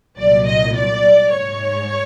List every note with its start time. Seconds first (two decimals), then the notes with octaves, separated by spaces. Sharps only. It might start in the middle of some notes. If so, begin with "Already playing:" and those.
0.18 C2 A#2 F#3 D5
0.46 D#5
0.75 D5
1.32 G#2 C#5